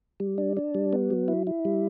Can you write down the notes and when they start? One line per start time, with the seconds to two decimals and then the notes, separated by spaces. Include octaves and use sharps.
0.20 G3
0.38 D4
0.57 D4
0.75 G3
0.93 B3
1.10 F#3
1.28 E4
1.47 E4
1.65 G3